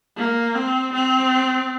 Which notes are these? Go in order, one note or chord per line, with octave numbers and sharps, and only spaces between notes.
A#3
C4
C4